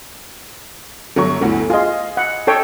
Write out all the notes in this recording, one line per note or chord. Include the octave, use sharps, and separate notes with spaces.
G1 F#3 C#6
G1 D2 A2
F4 G#4 D#5
F#5
A4 C#5 G5